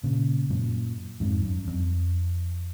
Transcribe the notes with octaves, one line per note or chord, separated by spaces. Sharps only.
A#2 C#3
F#2 A#2
F2 G#2
F#2
F2